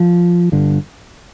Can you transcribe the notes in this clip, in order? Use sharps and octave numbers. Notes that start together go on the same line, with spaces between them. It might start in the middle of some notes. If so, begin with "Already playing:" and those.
Already playing: F3
G1 G2 D3